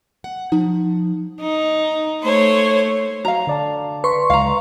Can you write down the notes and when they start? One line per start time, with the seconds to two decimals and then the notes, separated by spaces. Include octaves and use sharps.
0.24 F#5
0.52 F3 D#4
1.42 D#4
2.23 A3 C5 C#5
3.25 F#4 F5 A#5
3.47 D3 D5 A5
4.04 B4 C6 C#6
4.30 C#2 F5 A#5